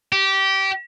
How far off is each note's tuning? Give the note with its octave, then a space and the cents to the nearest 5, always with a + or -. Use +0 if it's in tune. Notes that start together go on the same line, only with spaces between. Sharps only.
G4 -20